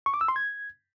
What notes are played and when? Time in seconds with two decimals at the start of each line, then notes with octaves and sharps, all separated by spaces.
0.06 C#6
0.14 D6
0.21 E6
0.28 C6
0.36 G#6